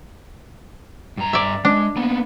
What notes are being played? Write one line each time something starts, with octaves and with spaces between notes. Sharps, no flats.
G2 A#5
D5 E5
G#3 D4
A#3 B3